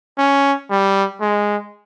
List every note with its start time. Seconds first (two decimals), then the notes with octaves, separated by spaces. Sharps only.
0.18 C#4
0.70 G3
1.21 G#3